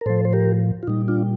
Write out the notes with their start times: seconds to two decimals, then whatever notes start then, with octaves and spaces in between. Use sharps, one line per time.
0.01 A#4
0.06 A2 F3 A4 C5
0.25 C5
0.33 G4 A#4
0.83 F4
0.87 A#2 G3 D#4
1.08 D4 F4